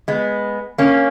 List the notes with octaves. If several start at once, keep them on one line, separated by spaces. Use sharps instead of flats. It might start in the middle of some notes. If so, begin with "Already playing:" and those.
G#3 B3
A#3 C#4